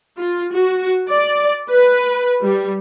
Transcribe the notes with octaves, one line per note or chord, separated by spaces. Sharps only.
F4
F#4
D5
B4
G3